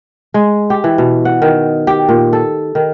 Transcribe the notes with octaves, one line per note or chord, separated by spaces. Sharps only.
G#3
G4
E3
B2
F#5
D#3
G4
A#2
A4
D#3